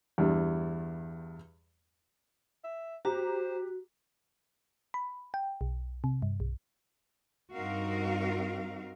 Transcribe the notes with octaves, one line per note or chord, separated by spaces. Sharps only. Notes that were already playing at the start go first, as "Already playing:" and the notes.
E2 G2 G3
E5
F#4 G4 C5 A#5
B5
G5
B1
C3
G2
B1
G2 C4 D#4 F#4 A#4 F5